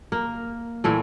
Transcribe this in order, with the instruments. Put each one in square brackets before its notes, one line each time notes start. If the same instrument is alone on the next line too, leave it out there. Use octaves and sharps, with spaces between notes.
[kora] A#3
A#2 E3 A3